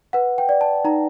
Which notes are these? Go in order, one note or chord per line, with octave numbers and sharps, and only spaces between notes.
B4 F#5
G5
D5
A5
D#4 A#5